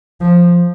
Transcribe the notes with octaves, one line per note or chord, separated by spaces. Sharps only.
F3